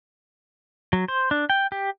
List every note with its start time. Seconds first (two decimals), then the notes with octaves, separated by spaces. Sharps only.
0.93 F#3
1.08 C5
1.31 D4
1.50 G5
1.72 G4